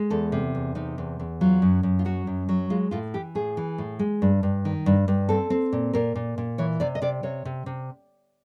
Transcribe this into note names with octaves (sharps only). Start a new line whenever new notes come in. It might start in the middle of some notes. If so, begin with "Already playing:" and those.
Already playing: G#3
E2 A4
C3
E2
C3 D#4
E2
E2
F#3 F4
F#2
F#2
F4
F#3 F#4
F#2
F#3
G#3 F4
A2 F4
E3 G4
A2 G#4
E3
A2
G#3
G2
G2
D#3
G2
G2
C4 A4
C4
A#2
A#2 A#4
A#2
A#2
E3 C#5
C3 D5
D#5
C3 D5
C3 C#5
C3
C3